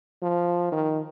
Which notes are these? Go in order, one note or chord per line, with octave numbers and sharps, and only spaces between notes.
F3
D#3